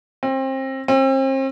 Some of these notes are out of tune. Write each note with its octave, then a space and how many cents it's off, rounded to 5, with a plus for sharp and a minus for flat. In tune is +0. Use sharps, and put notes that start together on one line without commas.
C4 +30
C4 +40